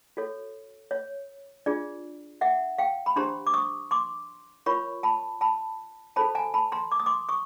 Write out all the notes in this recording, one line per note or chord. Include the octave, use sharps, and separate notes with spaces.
F#4 A4 C#5
C#5
D4 F4 G#4 D5
E5 F#5
F5 G5
B5
D4 G4 C5 A#5 C6
D6
C#6 D#6
C6 D6
F4 A#4 C#5 B5 C#6
A5 B5
A5 B5
F#4 A4 C5 A5 B5
G#5 A#5
A5 B5
A#5 C6
D6
D#6
C6 D6
C#6 D#6